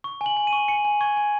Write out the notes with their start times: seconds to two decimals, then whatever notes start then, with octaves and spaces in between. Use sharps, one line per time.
0.04 C#6
0.21 G#5
0.26 F#7
0.37 G#5
0.47 D#7
0.53 C#6
0.68 G#5 C#7
0.85 G#5
1.01 C#6 G#6
1.17 G#5